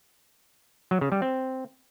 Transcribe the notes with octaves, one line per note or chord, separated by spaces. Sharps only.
F#3
C#3
G3
C4